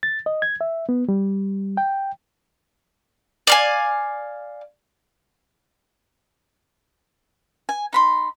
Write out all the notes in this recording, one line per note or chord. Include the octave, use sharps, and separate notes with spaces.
A6
D#5
G#6
E5
B3
G3
G5
D5 F5 G#5
G#5
D#4 B5 C6